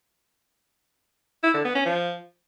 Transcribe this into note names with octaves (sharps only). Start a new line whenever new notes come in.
E4
D3
B3
C#4
F3